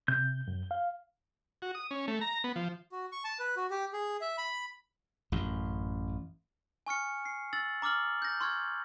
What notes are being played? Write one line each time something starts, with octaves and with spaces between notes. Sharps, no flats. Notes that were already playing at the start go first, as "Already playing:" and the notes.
C3 G6
F#2
F5
F#4
D#6
C#4
A3
A#5
B3
F3
F#4
C#6
A5
B4
F#4
G4
G#4
E5
B5
A1 F#2
G#5 C#6 F6 C#7
C7
E6 A6 F#7
A#5 D6 E6 F6 F#7
G6 A#6
C6 C#6 F6 G#6